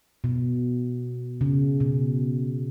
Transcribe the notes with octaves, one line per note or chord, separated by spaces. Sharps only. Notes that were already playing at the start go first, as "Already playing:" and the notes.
B2
C#3
B2